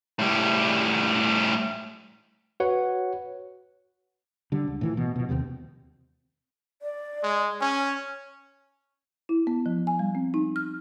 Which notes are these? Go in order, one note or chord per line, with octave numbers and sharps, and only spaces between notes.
A2 G3
F#4 B4 C#5 F#5
D3 G3
C#2
A2 E3 F3
B2
B2 F3
D#2 C3 G3 C4
D5
G#3
C#4 G#5
E4
B3
F3
G#5
G3
C4
D#4
F6